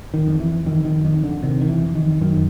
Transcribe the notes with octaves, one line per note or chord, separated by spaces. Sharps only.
D#3
F2
E3
F2 D#3
D#3
F2 D#3
D3
C3 D#3
D#3
E3
F2
D#3
F#2 D#3